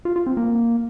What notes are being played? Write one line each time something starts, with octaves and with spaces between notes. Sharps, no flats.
F4
F4
C4
A#3